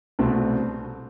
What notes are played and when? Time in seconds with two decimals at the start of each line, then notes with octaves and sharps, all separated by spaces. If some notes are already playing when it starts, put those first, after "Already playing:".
0.19 C2 B2 A3 C4